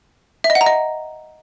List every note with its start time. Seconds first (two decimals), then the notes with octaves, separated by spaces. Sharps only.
0.44 E5
0.50 D#5
0.55 F#5
0.61 A#5
0.66 D#5